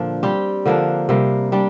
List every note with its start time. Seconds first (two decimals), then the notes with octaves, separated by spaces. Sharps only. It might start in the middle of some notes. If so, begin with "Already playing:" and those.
Already playing: A#2 D3 F3 D4
0.23 G3 C4 G4
0.65 D3 F3 A#3 D4
1.09 C3 G3 A#3
1.52 G3 D4 G4